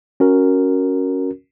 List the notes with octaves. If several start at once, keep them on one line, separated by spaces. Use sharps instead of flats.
C#4 F#4 A#4